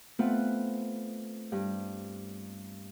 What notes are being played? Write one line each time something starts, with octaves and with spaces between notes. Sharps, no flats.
A3 B3 C4 F4 B4
G2